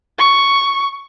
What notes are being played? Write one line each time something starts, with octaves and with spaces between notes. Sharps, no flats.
C#6